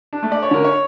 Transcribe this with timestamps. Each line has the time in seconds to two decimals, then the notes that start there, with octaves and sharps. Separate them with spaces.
0.13 D4
0.23 A3
0.32 D5
0.42 C#5
0.51 D3 A#4
0.64 C#5